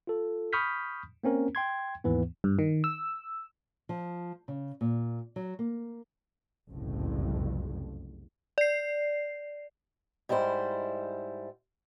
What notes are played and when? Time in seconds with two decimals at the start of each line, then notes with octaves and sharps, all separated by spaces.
0.07 F4 A4
0.53 B5 C#6 D#6 F6 G6 B6
1.24 A#3 C4 C#4 A#4
1.55 G5 C6 G#6
2.04 D#2 G#2 E3 B3
2.44 G2
2.59 D#3
2.84 E6
3.89 F3
4.48 C#3
4.81 A#2
5.36 F#3
5.59 A#3
6.70 F#1 C2 F2 A2
8.58 D5 C7
10.29 G#2 G3 E4 G#4 C5